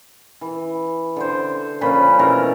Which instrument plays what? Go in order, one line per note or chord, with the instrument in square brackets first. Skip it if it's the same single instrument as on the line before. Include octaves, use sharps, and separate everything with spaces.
[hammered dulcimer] E3
D3 C5
A#2 F3 C#4 B5
B2 E3 A3 A#4